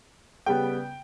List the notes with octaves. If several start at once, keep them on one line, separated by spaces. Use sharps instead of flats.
C#3 G3 B3 G5